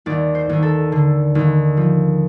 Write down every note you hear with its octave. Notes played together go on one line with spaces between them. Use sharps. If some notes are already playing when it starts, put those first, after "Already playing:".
D#2 D5
C5
D#2
A4
D3
D#2
F3